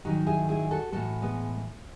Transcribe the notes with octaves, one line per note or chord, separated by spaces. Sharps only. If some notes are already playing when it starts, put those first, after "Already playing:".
G#2 D#3 F#3 D#4 F#4
E4 G#4
E4 G#4
F#4 A4
A2 E3 F#4 A4
G#3 B3